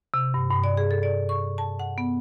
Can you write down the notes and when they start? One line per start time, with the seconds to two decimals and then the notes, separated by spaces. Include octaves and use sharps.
0.14 C3
0.34 G2
0.50 G2
0.64 D5
0.77 G#4
0.91 A4
1.03 D5
1.29 C#6
1.58 A5
1.79 F#5
1.98 B3